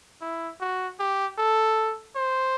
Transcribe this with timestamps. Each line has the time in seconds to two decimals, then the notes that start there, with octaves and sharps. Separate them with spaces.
0.21 E4
0.61 F#4
0.99 G4
1.38 A4
2.16 C5